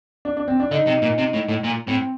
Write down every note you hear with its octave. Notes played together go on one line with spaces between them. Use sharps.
D4
D4
C4
D4
D3 D#4
C3
A#2
C3
A2
A2
A#2
A2 C4